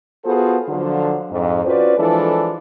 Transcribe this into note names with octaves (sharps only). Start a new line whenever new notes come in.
B3 F4 F#4 G#4 A4 C5
D3 F3 F#3
F2 G#2
C#4 F4 F#4 B4 C5 D5
E3 F3 G#3 D4 E4 A4